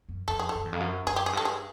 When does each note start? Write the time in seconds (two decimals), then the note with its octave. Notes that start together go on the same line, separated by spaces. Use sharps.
0.09 F#2
0.28 F2 A4
0.39 G#4
0.49 A4
0.55 F#2
0.65 E2
0.73 F2
0.80 F#2
1.07 F#2 G#4
1.16 G4
1.26 G#4
1.33 G2 A4
1.45 G#4